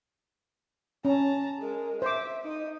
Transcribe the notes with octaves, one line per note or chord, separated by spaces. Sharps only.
C#4 A5 A#5
G#3 A#4
C5 E5 D6
D#4 D#5